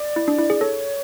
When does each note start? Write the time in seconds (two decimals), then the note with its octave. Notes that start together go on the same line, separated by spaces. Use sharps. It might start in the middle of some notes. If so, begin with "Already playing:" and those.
Already playing: D5
0.16 E4
0.28 D4
0.38 E4
0.50 G#4
0.61 A4 C#5